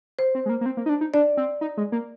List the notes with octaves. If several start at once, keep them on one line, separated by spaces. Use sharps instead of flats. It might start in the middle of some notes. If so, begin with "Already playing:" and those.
C5
C4
G#3
A#3
A#3
C4
A#3
D#4
D4
D#4
D4 D5
C4
D#4
G#3
A#3